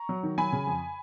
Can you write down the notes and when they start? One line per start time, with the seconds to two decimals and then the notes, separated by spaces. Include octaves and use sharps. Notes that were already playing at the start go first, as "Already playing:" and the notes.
Already playing: A#5 C#6
0.09 F#3
0.23 D#3
0.38 F#3 G#5 B5
0.53 C#3
0.67 F2